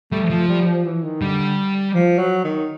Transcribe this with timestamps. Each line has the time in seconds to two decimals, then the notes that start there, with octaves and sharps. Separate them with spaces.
0.12 G3 A3
0.30 F3
0.48 G3
0.67 F3
0.85 E3
1.04 D#3
1.22 D3 G3
1.95 F3
2.19 F#3
2.44 D#3